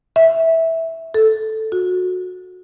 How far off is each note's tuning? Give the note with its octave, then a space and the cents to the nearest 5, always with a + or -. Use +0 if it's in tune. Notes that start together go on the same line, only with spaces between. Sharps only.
E5 -10
A4 +0
F#4 -20